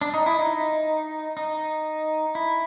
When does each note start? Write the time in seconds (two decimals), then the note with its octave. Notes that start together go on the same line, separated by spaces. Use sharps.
0.01 D4
0.14 D#4
0.26 E4
0.39 D#4
1.37 D#4
2.35 E4